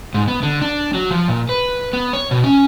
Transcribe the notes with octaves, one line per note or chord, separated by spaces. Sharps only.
G#2
B3
D3
D4
F#3
F3
A#2
B4
B3
C#5
B2
C#4